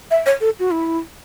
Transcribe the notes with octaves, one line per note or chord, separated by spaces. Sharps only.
E5
C#5
A4
F#4
E4